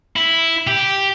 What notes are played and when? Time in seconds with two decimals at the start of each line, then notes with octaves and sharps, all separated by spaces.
0.16 E4
0.67 G4